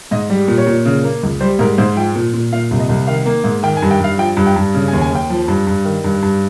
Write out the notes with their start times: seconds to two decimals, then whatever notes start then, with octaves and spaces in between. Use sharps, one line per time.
0.11 G#2 D#5
0.30 G3
0.48 A#2
0.58 C#5
0.66 A#2
0.85 C#3
1.04 A#3
1.23 C#2
1.41 G3 C5
1.59 G#2 A#4
1.78 G#2 C5
1.96 F3 G5
2.15 A#2
2.34 A#2
2.52 A#2 F5
2.71 C2
2.80 D#5
2.89 C2
3.07 D#3 F5
3.26 A#3
3.44 G#2
3.63 D#3 G5
3.77 G#5
3.82 G2
3.91 G5
4.00 G2 F5
4.18 F3 G5
4.37 G2
4.47 G5
4.56 G2
4.74 C#3
4.88 G#5
4.93 D#2
5.01 G#5
5.11 D#2 G5
5.30 F3
5.48 G2
5.67 G2
5.85 D#3
6.04 G2
6.22 G2